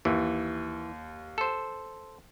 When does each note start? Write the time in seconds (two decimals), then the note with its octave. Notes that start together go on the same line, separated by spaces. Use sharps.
0.05 D#2 E3
1.38 A4 C5